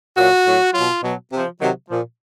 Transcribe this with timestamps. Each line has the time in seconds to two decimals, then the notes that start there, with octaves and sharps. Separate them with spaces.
0.17 A#2 F#3 F#4
0.45 A2 F#3
0.74 B2 F#3 F4
1.03 B2 F#3
1.31 C3 F3
1.60 C3 D#3 F#3
1.89 A#2 F3